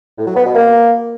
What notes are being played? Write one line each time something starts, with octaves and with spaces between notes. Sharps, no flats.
A2
F#3
B3
B2
A#3